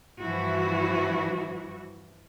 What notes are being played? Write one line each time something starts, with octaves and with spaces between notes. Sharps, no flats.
G2 E3 F3 E4 F#4